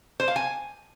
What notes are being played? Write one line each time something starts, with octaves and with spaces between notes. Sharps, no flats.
C5
F5
G#5